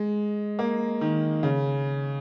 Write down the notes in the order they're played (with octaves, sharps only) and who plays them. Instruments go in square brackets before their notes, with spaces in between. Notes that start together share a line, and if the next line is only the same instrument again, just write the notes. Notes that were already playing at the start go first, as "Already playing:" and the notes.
Already playing: [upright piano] G#3
A#3
D#3
C#3